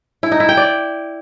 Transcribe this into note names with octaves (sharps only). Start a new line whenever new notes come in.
E4
D#4
E4
G5
D5